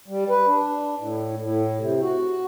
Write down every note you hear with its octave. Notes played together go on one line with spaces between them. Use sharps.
G3
B4
D4
A2
A2
C3
F#4